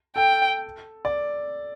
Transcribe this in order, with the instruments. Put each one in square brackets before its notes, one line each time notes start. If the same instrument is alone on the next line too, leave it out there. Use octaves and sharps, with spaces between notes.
[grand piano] A4 [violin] G5
[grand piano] D5